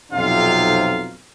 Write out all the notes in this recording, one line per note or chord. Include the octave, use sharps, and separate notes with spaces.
B1 F2 C3 D#4 F4 F5